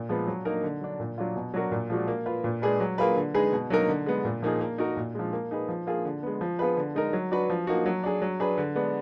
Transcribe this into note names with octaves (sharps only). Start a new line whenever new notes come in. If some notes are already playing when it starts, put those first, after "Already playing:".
Already playing: A#2
F3 G#3 B3
F#3
A#3 D#4 A#4
D3
F#3 D4
A#2
F#3 D4 F4
B2
F#3 D4 F#4 A#4
A#2
F3 G#3 D4 F#4
A#3
F4 B4
A#2
G#3 D4 G#4 B4
F#3
A#3 F4 G#4 B4
D3
G#3 D#4 G#4 B4
B2
F#3 A#3 D#4 A#4
D3
G#3 B3
A#2
F3 A#3 D#4 G#4
A#3
D#4 F#4 A#4
A#2
F3 G#3
A#3
D#4 G#4 B4
F3
A#3 F4 G#4
D3
G#3 B3
F3
B3 F4 G#4 B4
D3
G#3 D#4 A#4
F#3
D4 F#4 B4
F3
A#3 D#4 F#4
F#3
D4 G#4
F#3
D4 G#4 B4
D3
G#3 B3 D4